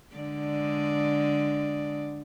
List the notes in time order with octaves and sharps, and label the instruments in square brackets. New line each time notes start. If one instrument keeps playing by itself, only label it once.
[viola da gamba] D3 G#3 D5